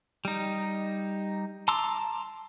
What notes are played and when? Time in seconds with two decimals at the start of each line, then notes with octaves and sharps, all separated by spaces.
0.25 G3 D#4
1.68 A5 A#5 C6 D6 E6